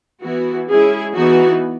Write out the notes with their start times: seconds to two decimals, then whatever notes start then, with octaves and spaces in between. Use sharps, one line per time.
0.21 E3 B3 E4 F#4
0.69 G#3 C#4 E4 G#4
1.15 E3 B3 D#4 F#4